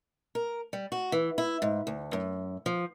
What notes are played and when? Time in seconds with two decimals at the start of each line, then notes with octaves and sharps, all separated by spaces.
0.35 A#4
0.73 G3
0.92 F#4
1.12 E3
1.38 E4
1.62 G#2
1.87 D2
2.13 F#2
2.66 F3